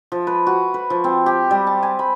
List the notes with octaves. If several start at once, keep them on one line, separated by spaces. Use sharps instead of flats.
F3
B4
F#4
B4
F3
C4
G4
G3
A5
G#5
B5